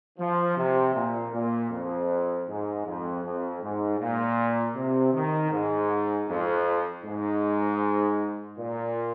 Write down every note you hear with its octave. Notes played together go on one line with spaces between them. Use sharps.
F3
C3
A#2
A#2
F2
G#2
F2
F2
G#2
A#2
C3
D#3
G#2
F2
G#2
A#2